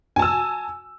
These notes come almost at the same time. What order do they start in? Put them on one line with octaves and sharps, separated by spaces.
G#5 A5 E6